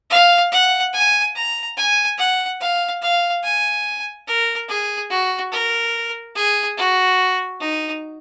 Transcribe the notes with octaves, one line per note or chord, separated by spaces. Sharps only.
F5
F#5
G#5
A#5
G#5
F#5
F5
F5
G#5
A#4
G#4
F#4
A#4
G#4
F#4
D#4